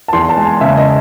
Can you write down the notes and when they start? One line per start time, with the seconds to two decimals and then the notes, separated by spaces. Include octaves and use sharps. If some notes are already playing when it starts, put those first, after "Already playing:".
0.08 A5
0.13 E2 C6
0.29 A5
0.37 G#3
0.45 G#5
0.61 C#3 E5
0.77 D#5